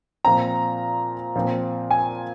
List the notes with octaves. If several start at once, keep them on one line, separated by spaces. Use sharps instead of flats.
A#2 F3 C4 A#5
A#2 F3 C4
G#5